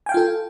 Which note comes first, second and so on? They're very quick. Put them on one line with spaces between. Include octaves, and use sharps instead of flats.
G#5 G5 F5 F4 A4